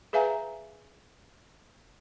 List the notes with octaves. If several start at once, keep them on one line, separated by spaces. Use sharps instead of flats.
G#4 B4 E5 F5 G#5 A#5